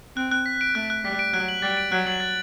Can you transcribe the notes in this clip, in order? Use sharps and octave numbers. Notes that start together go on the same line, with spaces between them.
C4 F#6
F#6
B6
D7
A3 F#6
F#6
G3 B6
D7
F#3 F#6
F#7
G3 A6
D7
F#3 F#6
F#7
A6